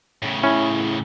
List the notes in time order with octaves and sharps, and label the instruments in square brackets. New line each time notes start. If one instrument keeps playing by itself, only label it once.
[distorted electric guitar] A2 C#3
[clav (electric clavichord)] C#4 [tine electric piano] E4